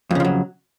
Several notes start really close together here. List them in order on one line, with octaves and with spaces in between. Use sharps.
F2 C#3 F3 F#3